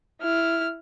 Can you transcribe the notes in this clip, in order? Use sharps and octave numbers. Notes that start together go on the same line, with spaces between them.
E4 F6